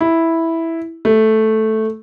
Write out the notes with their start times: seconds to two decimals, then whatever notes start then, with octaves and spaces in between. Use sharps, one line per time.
0.01 E4
1.05 A3